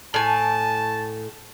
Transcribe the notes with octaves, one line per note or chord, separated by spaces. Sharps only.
A2 G#5 A5